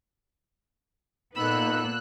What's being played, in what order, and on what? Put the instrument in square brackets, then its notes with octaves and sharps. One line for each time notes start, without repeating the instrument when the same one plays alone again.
[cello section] A#2 A#3 B3 [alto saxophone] D#4 [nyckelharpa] A4 B5 [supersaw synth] E6 F#6